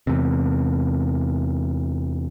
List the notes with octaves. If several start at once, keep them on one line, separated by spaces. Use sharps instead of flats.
E2 C3